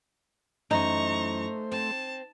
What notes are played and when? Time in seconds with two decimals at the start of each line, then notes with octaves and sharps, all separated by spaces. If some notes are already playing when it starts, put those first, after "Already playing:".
0.71 F#2 E3 A3 D#4 C5 A#5 C#6
1.72 C4 A5